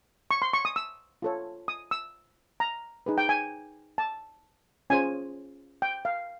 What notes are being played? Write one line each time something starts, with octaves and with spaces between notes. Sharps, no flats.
C#6
C6
C#6
D#6
E6
F4 A4 C#5
D#6
E6
A#5
D#4 G#4 B4
G5
G#5
A5
C#4 F4 G#4 C5 G#5
G5
F5